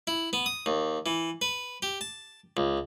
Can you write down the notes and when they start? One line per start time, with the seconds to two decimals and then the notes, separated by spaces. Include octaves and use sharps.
0.07 E4
0.33 B3
0.46 D#6
0.66 D#2
1.06 E3
1.42 B4
1.82 G4
2.01 A5
2.57 C#2